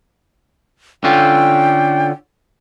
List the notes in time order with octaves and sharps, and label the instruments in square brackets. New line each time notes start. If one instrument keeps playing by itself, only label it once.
[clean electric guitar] D3 C#4 F4 [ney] G5